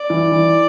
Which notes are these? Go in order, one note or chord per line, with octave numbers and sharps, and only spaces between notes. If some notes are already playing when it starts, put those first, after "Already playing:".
Already playing: D5
E3
E3